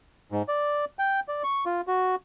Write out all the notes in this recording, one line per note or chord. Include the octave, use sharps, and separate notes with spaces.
G#2
D5
G5
D5
C#6
F4
F#4